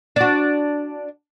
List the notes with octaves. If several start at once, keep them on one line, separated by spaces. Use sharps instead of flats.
D4 F#4